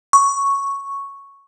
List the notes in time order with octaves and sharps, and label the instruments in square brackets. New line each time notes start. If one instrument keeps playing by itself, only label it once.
[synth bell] C#6